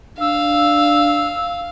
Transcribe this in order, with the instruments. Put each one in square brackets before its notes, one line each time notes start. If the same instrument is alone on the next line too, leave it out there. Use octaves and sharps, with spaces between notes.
[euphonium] D4 [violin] F5 [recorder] E6